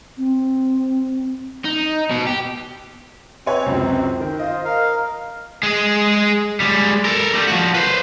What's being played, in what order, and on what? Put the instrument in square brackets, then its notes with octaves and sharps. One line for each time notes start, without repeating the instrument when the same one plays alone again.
[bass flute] C4
[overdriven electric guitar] D#4
B2
G4
[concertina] C4 [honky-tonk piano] B4 C#5 G#5
[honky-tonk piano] C#2 F#2 C3
[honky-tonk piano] D#3 [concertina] G5
[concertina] F4 C5 [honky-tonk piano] D#5
[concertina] A#4 F5
[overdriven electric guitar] G#3 G#4
G3 G#3
A4 A#4
G3 A3
F3 F#4
B4 C5